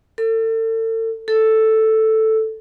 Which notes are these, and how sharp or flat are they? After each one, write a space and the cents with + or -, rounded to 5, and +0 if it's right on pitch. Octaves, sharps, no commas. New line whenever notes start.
A4 +35
A4 +0